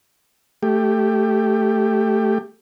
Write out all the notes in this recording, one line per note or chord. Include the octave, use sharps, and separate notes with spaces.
A3 G4